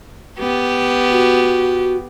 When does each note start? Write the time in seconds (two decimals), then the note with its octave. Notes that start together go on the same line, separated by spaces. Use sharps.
0.39 B3 G4
1.11 F#4